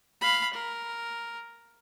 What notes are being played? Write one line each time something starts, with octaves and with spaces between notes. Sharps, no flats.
F5 B5
A#4